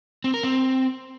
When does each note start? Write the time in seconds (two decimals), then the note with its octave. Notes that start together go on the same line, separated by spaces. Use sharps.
0.24 C4
0.34 A#4
0.43 C4